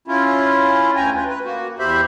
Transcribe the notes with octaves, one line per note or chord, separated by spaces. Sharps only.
C#4 E4 F4
D2 G5 G#5 A#5
F4 B4
B4
A#3 F#4
E2 G4 C5 E5 B5